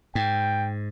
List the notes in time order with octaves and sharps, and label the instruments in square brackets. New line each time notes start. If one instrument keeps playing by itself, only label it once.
[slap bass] G#2 [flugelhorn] G5